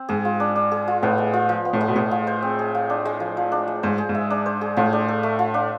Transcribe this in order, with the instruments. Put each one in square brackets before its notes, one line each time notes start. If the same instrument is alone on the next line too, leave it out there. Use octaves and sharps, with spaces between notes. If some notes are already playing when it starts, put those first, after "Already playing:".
Already playing: [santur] C4
[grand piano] G#2 [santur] G#4
[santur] F4
D4
D4
G#4
F4
[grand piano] A2 [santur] B3
[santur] G#3
F4
F3
B3
[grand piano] A2
[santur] G#3
[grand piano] B2
[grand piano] A2 [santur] G#4
[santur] F4
C5
C4
G#4
F4
D4
G#3
F3
F3
D4
G#3
[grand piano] G#2 [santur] C5
[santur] G#4
[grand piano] G#2
[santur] E5
D4
C5
G#4
[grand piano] A2 [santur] F4
[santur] D4
A4
A3
F4
D4